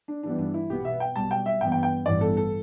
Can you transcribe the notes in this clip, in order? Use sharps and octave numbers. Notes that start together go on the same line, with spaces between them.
D4
G2 E3 G3 B3 D4
D4
E4
B1 B2 B3 G4
E5
G5
B1 B2 G3 A5
G5
E5
G2 E3 B3 G5
G5
G5
A1 G2 E3 B3 D5
A4
A4